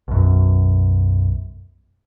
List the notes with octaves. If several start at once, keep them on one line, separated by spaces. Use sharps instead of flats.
B1 F#2